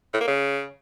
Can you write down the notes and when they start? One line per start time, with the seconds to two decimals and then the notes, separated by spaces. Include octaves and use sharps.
0.14 A2
0.21 A#3
0.28 C#3